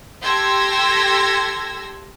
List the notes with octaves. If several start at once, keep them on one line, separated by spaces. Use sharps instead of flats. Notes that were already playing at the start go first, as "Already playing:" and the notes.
G4 A4 C6 E6 G#6 A#6